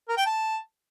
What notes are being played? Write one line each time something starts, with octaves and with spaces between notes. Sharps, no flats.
A#4
G5
A5